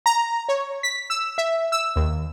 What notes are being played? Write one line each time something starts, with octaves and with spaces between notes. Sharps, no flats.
A#5
C#5
B6
E6
E5
E6
D#2